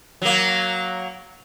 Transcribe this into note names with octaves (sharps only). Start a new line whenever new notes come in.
F#3 A#3